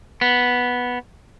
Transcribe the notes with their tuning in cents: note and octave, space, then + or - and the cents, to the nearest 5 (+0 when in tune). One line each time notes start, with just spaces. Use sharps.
B3 -5